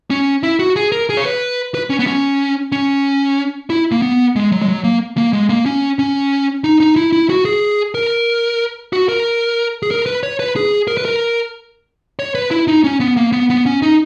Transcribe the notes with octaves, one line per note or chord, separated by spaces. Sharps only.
C#4
E4
F#4
G#4
A#4
G#4
C#5
B4
B4
C#4
B3
C#4
C#4
E4
A#3
B3
G#3
F#3
G#3
F#3
A#3
A#3
G#3
A#3
C#4
C#4
D#4
D#4
E4
E4
F#4
G#4
A#4
F#4
A#4
G#4
A#4
B4
C#5
B4
G#4
A#4
B4
A#4
C#5
B4
E4
D#4
C#4
B3
A#3
B3
B3
C#4
D#4